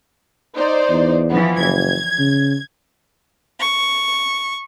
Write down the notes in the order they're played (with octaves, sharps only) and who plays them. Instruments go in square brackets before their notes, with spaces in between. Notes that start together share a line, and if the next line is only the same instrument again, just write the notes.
[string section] D#4 C5 D5
[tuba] E2
[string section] E3 F3 B3
[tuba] F#1 [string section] G#6
[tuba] C#3
[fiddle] C#6